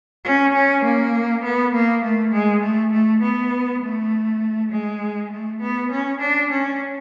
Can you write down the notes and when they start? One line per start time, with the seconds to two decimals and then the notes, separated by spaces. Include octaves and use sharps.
0.24 C#4
0.54 C#4
0.84 A#3
1.44 B3
1.74 A#3
2.03 A3
2.33 G#3
2.62 A3
2.92 A3
3.22 B3
3.83 A3
4.71 G#3
5.31 A3
5.61 B3
5.91 C#4
6.21 D4
6.51 C#4